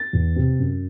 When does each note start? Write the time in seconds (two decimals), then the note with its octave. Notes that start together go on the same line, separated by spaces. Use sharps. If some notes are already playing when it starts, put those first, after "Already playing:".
Already playing: A6
0.13 E2
0.36 C3
0.59 F#2